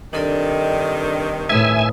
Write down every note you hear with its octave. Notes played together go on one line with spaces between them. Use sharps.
G2 C3 D#3 D4 A4 D5
A2 B4 E5 G#5 D#6